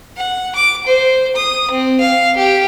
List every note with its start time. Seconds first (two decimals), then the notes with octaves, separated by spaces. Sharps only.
0.17 F#5
0.56 D6
0.87 C5
1.36 D#6
1.71 C4
2.00 F5
2.37 G4